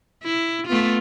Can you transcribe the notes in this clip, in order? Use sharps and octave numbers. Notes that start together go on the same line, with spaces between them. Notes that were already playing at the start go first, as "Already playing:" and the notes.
E4
A3 B3 F4